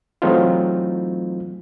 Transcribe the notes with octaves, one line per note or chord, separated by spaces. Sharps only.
E3 F#3 A3 C4 D#4 F4